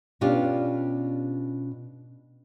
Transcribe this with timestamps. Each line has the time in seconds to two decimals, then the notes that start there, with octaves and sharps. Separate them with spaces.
0.21 B2 C#4 D4 F4 G4